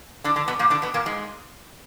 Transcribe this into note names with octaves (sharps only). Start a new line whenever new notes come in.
D3 D4
D3 D4
B2 B3
A#2 A#3
D3 D4
B2 B3
A#2 A#3
G#2 G#3